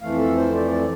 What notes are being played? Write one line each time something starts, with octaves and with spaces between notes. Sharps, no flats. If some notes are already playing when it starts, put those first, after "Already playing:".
F2 E3 A3 F5
A4
C5
D5
D5